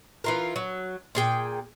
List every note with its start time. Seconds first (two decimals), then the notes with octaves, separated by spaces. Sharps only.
0.24 E3 F4 A#4
0.56 F#3
1.15 A#2 G#4 G5